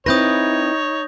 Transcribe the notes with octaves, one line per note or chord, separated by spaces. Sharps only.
C4 D#4 E4 B4 C#5 D#6 G6 A#6